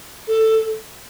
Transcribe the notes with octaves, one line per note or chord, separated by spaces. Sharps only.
A4